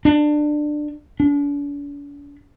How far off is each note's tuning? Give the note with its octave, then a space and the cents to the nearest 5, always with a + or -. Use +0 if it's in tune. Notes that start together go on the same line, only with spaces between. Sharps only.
D4 +20
D4 -45